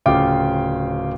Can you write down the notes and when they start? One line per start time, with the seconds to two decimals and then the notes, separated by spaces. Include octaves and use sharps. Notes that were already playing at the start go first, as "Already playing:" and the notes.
0.06 D1 C#3 F4 G5 D6